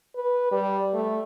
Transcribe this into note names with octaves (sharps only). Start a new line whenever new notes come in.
B4
G3
A3